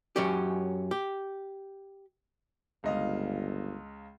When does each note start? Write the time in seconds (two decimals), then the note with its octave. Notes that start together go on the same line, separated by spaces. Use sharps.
0.16 F#2 F#3 C#4 G4
0.91 G4
2.84 G1 C#2 D#5 F5